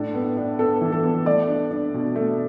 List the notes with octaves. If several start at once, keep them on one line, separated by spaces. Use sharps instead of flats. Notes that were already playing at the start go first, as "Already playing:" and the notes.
Already playing: A2 D4 A4
B3
D4
B3 A4
E3
A4
B3
A3 D5
D4
D4
B2
A3